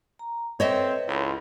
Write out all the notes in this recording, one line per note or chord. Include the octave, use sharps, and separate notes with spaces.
A#5
C4 A4 B4 C#5 D#5 E5
C#2 E4 B5 C6